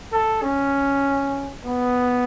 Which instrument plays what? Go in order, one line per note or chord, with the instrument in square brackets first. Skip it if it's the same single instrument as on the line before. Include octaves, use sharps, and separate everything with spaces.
[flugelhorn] A4
C#4
B3